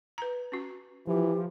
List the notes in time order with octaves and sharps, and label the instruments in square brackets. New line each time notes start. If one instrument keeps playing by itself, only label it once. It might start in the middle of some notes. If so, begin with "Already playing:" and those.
[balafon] B4 A#5
C#4 F#4
[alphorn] E3 [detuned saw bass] F3 [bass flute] G4